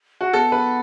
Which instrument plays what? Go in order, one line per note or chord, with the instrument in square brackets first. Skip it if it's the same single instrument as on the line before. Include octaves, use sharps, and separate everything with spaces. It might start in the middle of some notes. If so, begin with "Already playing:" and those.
[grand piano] F#4
[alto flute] B3 [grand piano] A4
[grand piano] B4